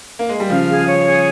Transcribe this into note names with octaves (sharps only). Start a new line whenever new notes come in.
A#3
G#3
G3
C#3 F3 F5
G#4
C#5
G#4